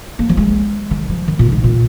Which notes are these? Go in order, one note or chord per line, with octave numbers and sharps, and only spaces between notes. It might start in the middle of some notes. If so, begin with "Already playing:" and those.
A#3
F3
G#3
D#3
F3
D#3
A#2
G#2
A#2